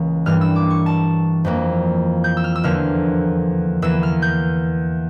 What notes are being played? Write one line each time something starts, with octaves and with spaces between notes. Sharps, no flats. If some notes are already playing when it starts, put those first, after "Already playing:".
Already playing: C#2 C#3 E3 A#3 C#4
G2 E3 G3 A#3 F6
E6
D6
C#6
A5
F2 E3 A#3
G6
E6
F6
E6
E2 D3 F3 A#3 F6
E2 E3 A#3 E6
F6
G6